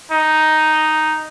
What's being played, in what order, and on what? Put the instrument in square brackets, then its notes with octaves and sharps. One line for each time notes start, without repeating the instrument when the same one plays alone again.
[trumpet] D#4